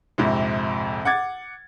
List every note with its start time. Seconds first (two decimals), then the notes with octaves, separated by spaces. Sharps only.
0.18 A#1 F2 G#2 C3
1.05 F#5 D6 G#6 A6